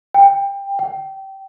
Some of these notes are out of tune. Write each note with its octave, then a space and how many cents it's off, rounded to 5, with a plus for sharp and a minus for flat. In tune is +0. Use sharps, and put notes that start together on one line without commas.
G5 +20
G5 -20